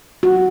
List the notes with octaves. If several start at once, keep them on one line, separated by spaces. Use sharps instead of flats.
F#4